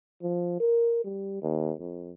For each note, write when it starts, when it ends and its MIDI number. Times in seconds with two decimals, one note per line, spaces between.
0.22 0.59 53
0.60 1.00 70
1.04 1.40 55
1.42 1.73 39
1.80 2.12 41